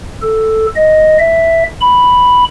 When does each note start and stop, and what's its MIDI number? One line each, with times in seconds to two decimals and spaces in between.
0.22 0.67 69
0.76 1.18 75
1.19 1.63 76
1.81 2.44 83